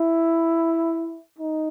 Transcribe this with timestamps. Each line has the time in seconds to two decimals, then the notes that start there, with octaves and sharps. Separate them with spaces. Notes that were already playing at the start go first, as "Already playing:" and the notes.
Already playing: E4
1.39 D#4